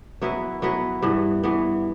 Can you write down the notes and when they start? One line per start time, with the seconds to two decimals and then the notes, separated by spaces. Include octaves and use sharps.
0.22 F#3 B3 E4 B4
0.62 F#3 B3 E4 B4
1.02 G2 E3 B3
1.43 G2 E3 B3